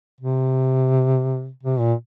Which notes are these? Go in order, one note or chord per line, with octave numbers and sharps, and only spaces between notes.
C3
C3
A#2